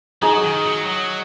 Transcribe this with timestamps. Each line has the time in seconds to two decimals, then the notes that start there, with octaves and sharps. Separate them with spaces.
0.22 F#3 D#4 G#4 D#5
0.43 D#3
0.64 F#3
0.86 F#3